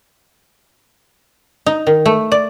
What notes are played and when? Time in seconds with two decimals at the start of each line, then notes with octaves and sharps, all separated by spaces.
1.66 D#4
1.87 D#3
2.06 A3
2.32 D5